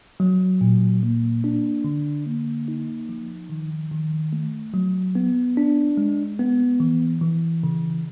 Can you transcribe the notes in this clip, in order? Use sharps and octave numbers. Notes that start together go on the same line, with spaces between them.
F#3
A#2
A#3
D4
D3
A#3
D#4
F3
D#3
D#3
A3
F#3
B3
D4
G#3
B3
E3
E3
C#3